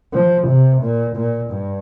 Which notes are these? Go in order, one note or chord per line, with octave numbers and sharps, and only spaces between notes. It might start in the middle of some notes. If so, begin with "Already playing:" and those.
F3
C3
A#2
A#2
G2